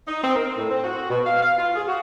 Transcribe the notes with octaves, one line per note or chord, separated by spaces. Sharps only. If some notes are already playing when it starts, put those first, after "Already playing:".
D#4
C4
A#4
A2
C4
F#4
B2
F5
F5
F4
G#4
F#4